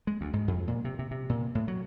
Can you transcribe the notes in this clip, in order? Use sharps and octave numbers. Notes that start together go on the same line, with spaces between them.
G#3
D2
G#2
F2
A#2
C3
C3
C3
A#2
A2
F#3